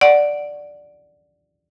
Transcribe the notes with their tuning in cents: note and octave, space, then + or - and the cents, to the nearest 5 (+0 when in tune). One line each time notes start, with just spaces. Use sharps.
D5 +0 F#5 +0